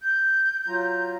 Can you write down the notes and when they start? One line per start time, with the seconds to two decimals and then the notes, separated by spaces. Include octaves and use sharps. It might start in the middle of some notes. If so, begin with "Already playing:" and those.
0.01 G6
0.68 F#3 F4 A#5